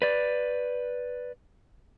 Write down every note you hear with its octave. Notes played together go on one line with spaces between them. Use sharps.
B4 D5